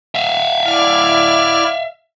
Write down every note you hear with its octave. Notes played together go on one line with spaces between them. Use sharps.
E5 F5
E4 D5 F6